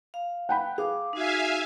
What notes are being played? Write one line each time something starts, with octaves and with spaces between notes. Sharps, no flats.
F5
F#5 G5 B5
G#4 F5 D6
D#4 F#4 E5 F5 G#5